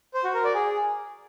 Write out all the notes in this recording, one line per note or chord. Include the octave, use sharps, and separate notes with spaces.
C5
F#4
A#4
D5
G#4